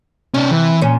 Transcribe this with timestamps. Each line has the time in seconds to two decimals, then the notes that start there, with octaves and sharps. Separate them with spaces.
0.34 C3 C#4 D5
0.51 E3
0.81 A#2 C#4